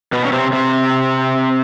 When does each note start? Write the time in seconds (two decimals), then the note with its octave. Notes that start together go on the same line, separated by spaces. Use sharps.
0.12 B2 B3
0.25 C#4
0.33 C3 C4
0.53 C3 C4